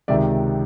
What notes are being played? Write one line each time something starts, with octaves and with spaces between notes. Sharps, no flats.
C#2 C3 D#3 D5 E5